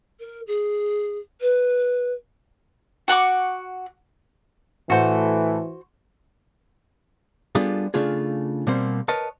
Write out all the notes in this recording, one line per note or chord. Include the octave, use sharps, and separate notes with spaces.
A#4
G#4
B4
F#4 F#5 C#6 D6
A2 E3 F#4 A4 C5
G3 B3 D4 F4 G#4 A4
C#3 A3 D4 F4 G#4
B2 G3 A#3 C4 C5
A#4 B4 C#5 D#5 A5